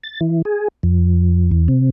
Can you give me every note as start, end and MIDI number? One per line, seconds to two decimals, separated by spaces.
0.04 0.20 93
0.21 0.42 52
0.45 0.68 68
0.83 1.50 41
1.51 1.68 40
1.68 1.90 48